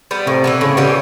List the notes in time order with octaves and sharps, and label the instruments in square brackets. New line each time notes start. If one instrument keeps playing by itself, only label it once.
[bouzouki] G3 B3
[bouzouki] A2 [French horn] C3
[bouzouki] E3 G3 B3
[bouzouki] A2 [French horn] C#3
[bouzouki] E3 G3 B3